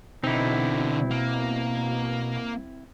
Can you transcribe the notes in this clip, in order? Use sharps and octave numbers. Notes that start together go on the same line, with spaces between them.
B2 D3 C4 D#4 E4
A#3